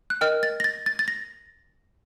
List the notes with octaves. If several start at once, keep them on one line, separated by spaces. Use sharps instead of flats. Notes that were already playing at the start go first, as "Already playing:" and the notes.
F#6
A#4 D#5 G5 F6
A6
A#6
A6
A6
A6
A#6